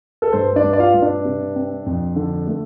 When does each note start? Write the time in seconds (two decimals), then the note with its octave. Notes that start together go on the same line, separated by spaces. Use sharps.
0.22 A4
0.33 G2 C5
0.56 D4 D5
0.64 G2
0.73 D5
0.79 F4 F5
0.94 G2
1.02 D4 D5
1.25 C3
1.56 C4
1.86 F2
2.16 D3
2.47 A3